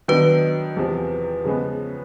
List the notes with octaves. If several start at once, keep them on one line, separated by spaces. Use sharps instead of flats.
D#3 F#3 B3 D4 B4
E2 C3 F3
C#3 F3 G#3 B3